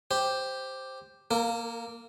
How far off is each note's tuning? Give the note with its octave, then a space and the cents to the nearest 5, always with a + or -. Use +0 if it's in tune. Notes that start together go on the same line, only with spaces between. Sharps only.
G4 +0 C5 +0
A#3 +0 A#4 -40